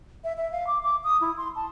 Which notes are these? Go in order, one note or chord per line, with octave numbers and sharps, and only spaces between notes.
E5
E5
F5
D6
D6
D#6
E4
C6
A5